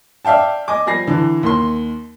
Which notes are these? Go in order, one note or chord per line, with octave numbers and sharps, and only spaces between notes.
D5 E5 F5 G5 A5
D#5 G#5 D6
F3 G3 G#5 A#6 C7
D3 E3
D#2 C6